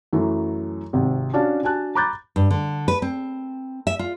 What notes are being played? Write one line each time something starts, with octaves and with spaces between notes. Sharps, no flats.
F#2 E3 F#3 A3
G#1 C3
C#4 D4 F#4 D5 F5 A5
D4 F#4 G#5 A5 F#6
A#5 B5 D6 F#6 G6 A6
G2
D3
B4
C4
E5
F4